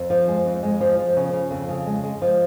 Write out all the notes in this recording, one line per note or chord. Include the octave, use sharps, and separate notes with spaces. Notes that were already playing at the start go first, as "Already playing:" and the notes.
Already playing: F2
F3
G#3
F2
G#3
F3
F3
C#3
C#3
F2
C#3
G#3
G#3
F3